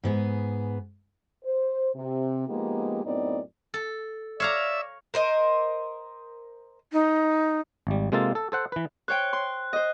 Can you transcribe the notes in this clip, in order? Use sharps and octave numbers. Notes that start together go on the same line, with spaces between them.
G#2 B3 G#4
C5
C3
F3 G#3 A#3 B3 D#4 G4
F#2 A2 B3 C4 D#4 D5
A4
C#5 D5 E5 F5 A#5
A#4 C5 D#5
D#4
G#1 G3
C3 G#3 A#3 F4 A4 A5
A4
A4 C5 F#5
E3 B4
C5 C#5 G5 F#6
C6
C5 D#5